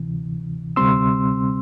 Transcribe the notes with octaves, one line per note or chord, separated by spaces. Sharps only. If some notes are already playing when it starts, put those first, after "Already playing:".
Already playing: D2 C3 E3
D2 C3 G3 C4 C6 E6